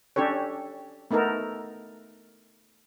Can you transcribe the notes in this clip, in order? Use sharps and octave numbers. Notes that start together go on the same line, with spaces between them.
C#4 D4 G4 A4 C#5
A3 B3 D#4 A4 A#4